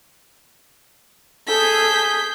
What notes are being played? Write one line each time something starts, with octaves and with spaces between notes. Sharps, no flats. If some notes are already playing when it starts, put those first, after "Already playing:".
G#4 A4 G6 B6